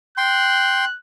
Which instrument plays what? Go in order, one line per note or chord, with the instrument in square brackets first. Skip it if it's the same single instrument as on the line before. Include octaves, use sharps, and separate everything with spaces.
[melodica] G5 C6 [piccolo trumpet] F#6